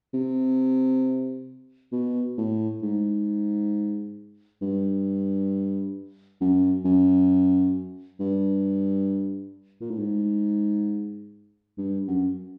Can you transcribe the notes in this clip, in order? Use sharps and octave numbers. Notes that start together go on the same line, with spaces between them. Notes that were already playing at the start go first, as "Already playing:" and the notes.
C3
B2
A2
G#2
G2
F#2
F#2
G2
A#2
A2
G#2
G2
F#2